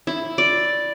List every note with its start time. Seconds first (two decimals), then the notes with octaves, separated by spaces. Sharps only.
0.07 E4
0.38 D5